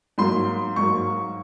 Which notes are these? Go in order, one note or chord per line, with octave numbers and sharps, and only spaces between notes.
G#2 F#3 A#3 C6
G#2 F#3 A#3 C#6